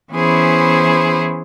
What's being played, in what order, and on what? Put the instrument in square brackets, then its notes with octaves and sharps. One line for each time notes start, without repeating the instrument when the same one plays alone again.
[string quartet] E3 B3 C#4 E4 G#4 C5